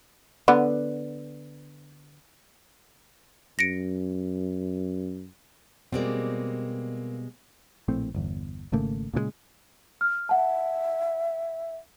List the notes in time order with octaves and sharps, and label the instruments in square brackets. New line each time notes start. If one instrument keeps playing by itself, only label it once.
[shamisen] D3 B3
[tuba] F#2 [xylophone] A#6 C#7 D7
[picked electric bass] B2 [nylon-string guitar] G3 G#3 D5 [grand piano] A#3 C4
[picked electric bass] A#1 A2 A3 C4
G1 E2
G#1 C#3 A3 A#3
A#2 C#3 E3 G#3
[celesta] F6
[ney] E5 [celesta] F#5 A5